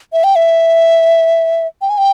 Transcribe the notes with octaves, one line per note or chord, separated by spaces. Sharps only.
E5
G5
E5
G5
G#5
G5